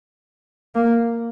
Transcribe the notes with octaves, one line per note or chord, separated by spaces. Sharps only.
A#3